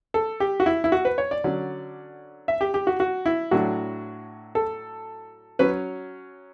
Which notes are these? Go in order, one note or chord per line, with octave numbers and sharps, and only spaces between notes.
A4
G4
F#4
E4
E4
F#4
B4
C#5
D5
D3 F#3 C#4
E5
G4
G4
F#4
F#4
E4
A2 F#3 A3 D4 F#4
A4
F#3 C#4 B4